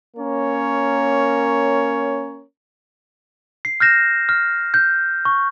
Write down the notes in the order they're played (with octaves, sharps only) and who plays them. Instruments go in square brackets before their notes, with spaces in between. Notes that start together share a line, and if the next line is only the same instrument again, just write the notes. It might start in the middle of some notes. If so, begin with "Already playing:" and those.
[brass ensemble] A#3 C#4 A#4 C#5
[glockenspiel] C7
F6 G6 A#6 E7
F6
G6
C#6